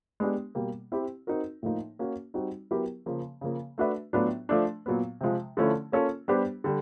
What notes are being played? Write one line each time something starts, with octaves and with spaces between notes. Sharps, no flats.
G#3 B3 D4 G4
B2 G3 A#3
C4 E4 G4
C4 D#4 F#4 A#4
A2 F3 A#3 D#4
A#3 C#4 F#4
G3 C4 D#4 F#4
F#3 B3 E4 G4 A#4
C#3 F3 A#3
C#3 F3 A#3
A3 D4 F#4 B4 E5
A2 F#3 B3 D4 F4
F3 A3 D4
A#2 F#3 B3
C3 F3 G#3
D3 F3 A3 C#4 E4
A#3 C#4 F4 A4 C#5
G3 B3 D4 G4 C5
D3 G3